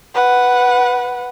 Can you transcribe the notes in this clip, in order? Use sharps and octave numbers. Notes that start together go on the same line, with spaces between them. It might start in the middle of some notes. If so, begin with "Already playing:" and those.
B4 F#5